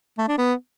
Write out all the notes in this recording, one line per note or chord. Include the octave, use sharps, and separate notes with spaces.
A3
D4
B3